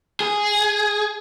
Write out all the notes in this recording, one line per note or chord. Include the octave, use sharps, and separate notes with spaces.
G#4